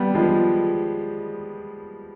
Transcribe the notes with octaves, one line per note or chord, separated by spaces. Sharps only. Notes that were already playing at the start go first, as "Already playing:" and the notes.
Already playing: G3 B3
F3 G#3